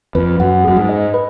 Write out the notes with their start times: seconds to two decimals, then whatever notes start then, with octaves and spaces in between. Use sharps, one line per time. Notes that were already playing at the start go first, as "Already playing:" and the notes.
0.15 F2 B4
0.40 F#2 F#5
0.64 F#2 G#4
0.77 G#2
0.89 D#5
1.14 B4